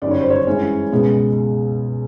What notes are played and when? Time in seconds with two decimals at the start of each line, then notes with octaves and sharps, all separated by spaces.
0.02 G1 F#2 D#3 G3 D5
0.11 C#5
0.21 C5
0.30 C#5
0.47 G2 E3 G#3 C#4
0.92 C#2 B2 G#3 B3